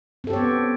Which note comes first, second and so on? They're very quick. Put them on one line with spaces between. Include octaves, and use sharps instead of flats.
C4 A4 G4 C#5 B3